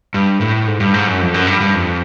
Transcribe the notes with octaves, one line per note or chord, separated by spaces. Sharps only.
G2
A2
G#2
G2
G#2
F#2
F2
F#2
G2
G2
F2